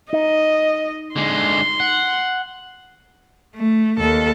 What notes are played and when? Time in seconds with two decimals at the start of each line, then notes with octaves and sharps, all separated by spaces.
0.13 D#4 D#5
1.16 D3 G#3 C6
1.80 F#5
3.56 A3
3.99 D#2 A4